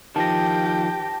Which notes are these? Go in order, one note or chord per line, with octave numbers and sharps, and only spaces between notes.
D#3 F3 G4 A5 A#6